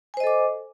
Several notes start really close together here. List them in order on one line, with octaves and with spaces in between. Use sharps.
G#5 C5 D#5 A4 D6